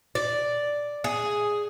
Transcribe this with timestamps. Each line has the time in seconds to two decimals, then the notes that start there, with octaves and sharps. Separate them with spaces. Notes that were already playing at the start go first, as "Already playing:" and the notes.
0.15 D5
1.04 G#4